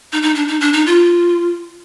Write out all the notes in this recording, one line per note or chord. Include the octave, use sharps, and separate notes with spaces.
D#4
D#4
D4
D#4
D4
D#4
F4